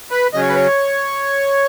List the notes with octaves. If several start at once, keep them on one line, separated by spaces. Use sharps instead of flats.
B4
C#3 F#3 C#4 D#5
C#5
B4
C#5